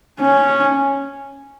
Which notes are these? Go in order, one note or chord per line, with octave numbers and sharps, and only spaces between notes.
C#4